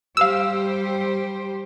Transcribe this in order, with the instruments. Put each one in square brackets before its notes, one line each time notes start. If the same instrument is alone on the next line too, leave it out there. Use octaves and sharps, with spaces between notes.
[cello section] G3 G4 C5 [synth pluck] F5 E6